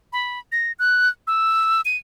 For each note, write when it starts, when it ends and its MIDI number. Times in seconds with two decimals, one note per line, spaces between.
0.13 0.39 83
0.52 0.72 94
0.79 1.09 90
1.27 1.81 88
1.85 1.97 99